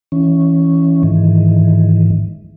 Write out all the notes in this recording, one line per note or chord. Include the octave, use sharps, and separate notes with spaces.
E3 C#4
G#2 D#3 E3